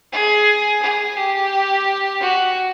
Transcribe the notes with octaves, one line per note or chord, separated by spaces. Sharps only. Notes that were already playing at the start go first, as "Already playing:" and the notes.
G#4
G#4
G4
F#4